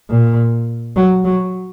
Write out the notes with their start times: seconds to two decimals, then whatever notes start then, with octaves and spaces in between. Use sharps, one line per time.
0.10 A#2
0.96 F#3
1.25 F#3